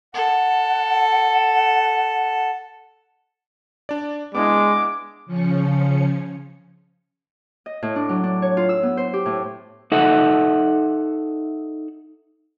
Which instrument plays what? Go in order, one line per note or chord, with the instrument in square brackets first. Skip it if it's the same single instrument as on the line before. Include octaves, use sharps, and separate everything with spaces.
[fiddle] A4 [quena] F#5
[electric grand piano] D4 D5
[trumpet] G#3 [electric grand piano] B3 D4 E4 [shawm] D6
[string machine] C#3 F3 C#4 C#7
[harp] D#5
A2
D4
F#3
D4
C#5
F4
E6
B3
C5
G4
A2
[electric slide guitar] D#4 A4 E5 F#5